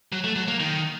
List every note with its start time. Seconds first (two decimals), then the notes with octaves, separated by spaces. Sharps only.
0.12 F#3
0.24 A3
0.36 F#3
0.48 A#3
0.60 D#3